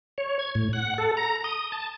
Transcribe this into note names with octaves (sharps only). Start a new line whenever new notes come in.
C#5
G#6
A2
F#5
A4
A#5
D#6
A5